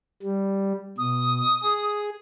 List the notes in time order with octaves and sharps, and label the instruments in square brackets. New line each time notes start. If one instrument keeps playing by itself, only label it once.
[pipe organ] G3
[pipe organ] B2 [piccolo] D#6
[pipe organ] G#4